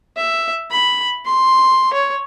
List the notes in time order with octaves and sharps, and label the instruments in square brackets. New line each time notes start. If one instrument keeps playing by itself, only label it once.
[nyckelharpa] E5
B5
C6
C#5